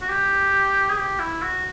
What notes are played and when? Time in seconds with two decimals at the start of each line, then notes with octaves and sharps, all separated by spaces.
0.01 F#4
0.09 G4
0.90 G#4
0.98 G4
1.19 E4
1.42 F#4